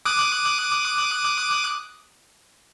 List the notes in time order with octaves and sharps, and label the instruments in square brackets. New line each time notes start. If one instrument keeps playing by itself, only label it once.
[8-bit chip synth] D6 D#6 F#6